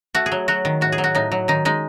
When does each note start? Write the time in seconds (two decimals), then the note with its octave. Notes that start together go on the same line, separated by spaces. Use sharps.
0.15 A3 F#4
0.26 G#4
0.32 F#3
0.48 F#3 F#4
0.65 D#3
0.81 A2 F#4
0.92 G#4
0.98 F#3
1.04 F#4
1.15 A2 D#4
1.32 F#3
1.48 D#3 D#4
1.65 G#3 D#4